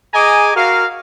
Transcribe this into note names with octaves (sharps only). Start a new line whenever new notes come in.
G#4 D#5 G#5 A#5 D6
F#4 A#4 F5